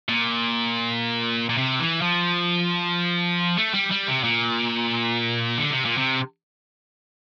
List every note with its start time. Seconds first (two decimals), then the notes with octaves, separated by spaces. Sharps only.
0.09 A#2
1.49 A#2
1.58 C3
1.79 E3
2.02 F3
3.57 A3
3.74 G3
3.91 G3
4.08 C3
4.24 A#2
5.57 D3
5.70 C3
5.85 A#2
5.98 C3